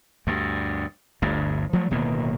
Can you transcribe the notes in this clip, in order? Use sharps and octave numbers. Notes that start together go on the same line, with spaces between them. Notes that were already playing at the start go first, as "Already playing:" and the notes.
D2 G2
G1 D2 G2
F3 F#3 A3
D1 B2 D#3 A#3